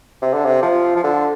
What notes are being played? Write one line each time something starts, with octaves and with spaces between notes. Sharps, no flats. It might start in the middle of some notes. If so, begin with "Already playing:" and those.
C3
D3
C3
F3
F3
D3